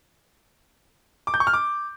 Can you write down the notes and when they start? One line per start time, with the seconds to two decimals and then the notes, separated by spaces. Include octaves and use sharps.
1.27 D6
1.34 G6
1.40 C#6
1.47 F6
1.53 D6